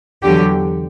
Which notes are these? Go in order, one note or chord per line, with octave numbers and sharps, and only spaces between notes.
E2 D3 F#3 G4